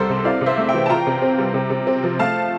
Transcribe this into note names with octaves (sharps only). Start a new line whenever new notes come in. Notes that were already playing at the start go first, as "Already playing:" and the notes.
Already playing: C2 G3 A4 A#4 C5
C3
E4 D5 F5
C3
C5 E5
A3
E5 G5
E3
A5
F4 G5 A#5
C3
C4
G3
C3
C3
C4
F3
A3 F5 A5